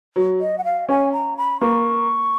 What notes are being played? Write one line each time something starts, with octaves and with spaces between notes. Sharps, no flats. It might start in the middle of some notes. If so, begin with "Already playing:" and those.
F#3
D#5
F#5
F5
C#4 G#5
A#5
B5
A#3 C#6